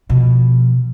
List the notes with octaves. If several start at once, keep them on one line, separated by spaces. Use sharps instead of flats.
B2 F3